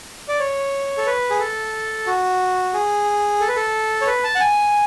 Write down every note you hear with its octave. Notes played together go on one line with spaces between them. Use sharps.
D5
C#5
A4
B4
G#4
A4
F#4
G#4
A4
B4
A4
C#5
B4
A5
F#5
G#5